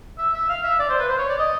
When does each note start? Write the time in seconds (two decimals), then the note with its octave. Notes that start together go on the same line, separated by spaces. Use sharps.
0.18 E5
0.34 E5
0.49 F5
0.63 E5
0.79 D5
0.89 C5
0.99 B4
1.09 C5
1.18 C#5
1.29 D5
1.38 D#5